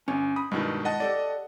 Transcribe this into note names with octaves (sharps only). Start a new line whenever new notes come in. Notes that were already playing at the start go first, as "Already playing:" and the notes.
G1 C#4
B5 D#6
G2 B2 D#3 G#3 B3 E4
D#5 F#5 A5
G4 A4 D5